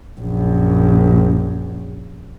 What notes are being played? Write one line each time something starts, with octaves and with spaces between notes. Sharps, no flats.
A#1 F#2